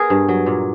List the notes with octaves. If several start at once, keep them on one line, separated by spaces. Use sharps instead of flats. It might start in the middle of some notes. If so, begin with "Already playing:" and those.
Already playing: B3 G#4 A#4
G2
F#3
A#2